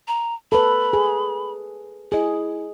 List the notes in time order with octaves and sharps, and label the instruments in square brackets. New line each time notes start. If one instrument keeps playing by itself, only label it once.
[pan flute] A#5
[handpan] A4 B4 [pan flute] B5
[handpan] G#4
[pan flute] E4 [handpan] G#4 D#5